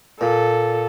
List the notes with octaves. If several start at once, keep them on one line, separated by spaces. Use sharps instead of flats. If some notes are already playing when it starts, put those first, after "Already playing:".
A#2 A4